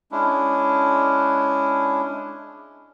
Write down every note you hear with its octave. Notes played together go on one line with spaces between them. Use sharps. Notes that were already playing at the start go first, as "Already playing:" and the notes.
G#3 C#4 D4 E4